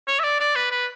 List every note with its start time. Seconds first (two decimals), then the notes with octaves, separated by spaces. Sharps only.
0.08 C#5
0.19 E5
0.24 D5
0.40 D5
0.56 B4
0.72 B4